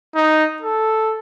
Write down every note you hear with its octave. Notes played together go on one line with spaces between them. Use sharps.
D#4
A4